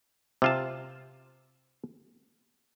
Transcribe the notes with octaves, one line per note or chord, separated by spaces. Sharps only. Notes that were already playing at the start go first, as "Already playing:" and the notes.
C3 F4 A5